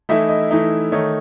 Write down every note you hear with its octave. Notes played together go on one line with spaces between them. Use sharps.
E3 A3 D#4 E4 E5
D#5
E3 A3 D#4
D#3 A3 D#4 C#5